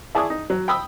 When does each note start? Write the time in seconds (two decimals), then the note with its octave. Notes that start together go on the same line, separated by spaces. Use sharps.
0.15 E4 G#4 D5 A5 C#6 D#6
0.30 D#4
0.50 F#3
0.68 G5 B5 D#6 E6